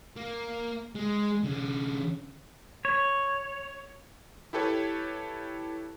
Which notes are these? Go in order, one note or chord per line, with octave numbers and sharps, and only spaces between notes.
A#3
G#3
D3 C#4
C#5
E4 G4 A4 B4 C#5